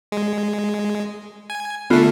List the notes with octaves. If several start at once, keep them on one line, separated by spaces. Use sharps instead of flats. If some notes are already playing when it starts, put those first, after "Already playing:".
G#3
G#5
D3 A3 B3 F4